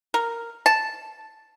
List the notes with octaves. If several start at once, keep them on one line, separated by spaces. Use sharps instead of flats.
A#4
A5